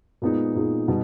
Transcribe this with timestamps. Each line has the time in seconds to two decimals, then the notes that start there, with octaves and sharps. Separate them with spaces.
0.22 A#2 G#3 B3 D#4
0.55 A#2 G#3 B3 D#4
0.88 B2 G3 B3 D#4